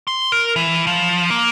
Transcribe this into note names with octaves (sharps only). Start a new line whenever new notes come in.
C6
A#4
E3
F3
A#3